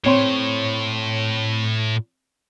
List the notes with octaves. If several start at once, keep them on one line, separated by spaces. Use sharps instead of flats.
A2 C4 C#5 C6